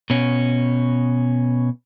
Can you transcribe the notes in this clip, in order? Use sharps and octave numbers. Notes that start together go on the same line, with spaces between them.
B2 C#4